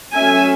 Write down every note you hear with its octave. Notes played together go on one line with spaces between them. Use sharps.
F#3 A3 C#4 E5 G#5